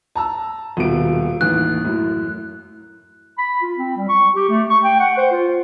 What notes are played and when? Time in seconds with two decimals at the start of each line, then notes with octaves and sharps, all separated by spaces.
0.16 A5 A#5 E6
0.77 D#1 B2 D7
1.41 A1 D#2 F#6
1.84 F#2 A2
3.38 B5
3.62 F4
3.77 C4
3.96 G3
4.09 C#6
4.35 G4
4.49 A3
4.70 C#6
4.83 G5
4.99 F#5
5.17 C5
5.31 F4